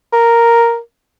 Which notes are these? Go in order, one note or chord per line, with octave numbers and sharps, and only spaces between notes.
A#4